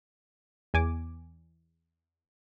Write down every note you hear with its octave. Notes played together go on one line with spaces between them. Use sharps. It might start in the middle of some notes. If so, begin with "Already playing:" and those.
E2 G#5 D6